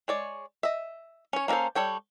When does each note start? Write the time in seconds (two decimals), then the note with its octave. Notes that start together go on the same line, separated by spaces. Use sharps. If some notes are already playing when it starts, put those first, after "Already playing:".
0.08 G#3 C#5 D5
0.63 D#5 E5
1.33 C#4 C#5
1.48 A#3 C#4 F#4 A4 C5
1.75 G3 A4 C#5 G5